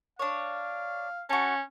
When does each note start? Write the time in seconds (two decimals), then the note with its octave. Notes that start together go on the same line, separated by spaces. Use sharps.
0.19 D4 C#5 F5
1.29 C#4 F#4 A5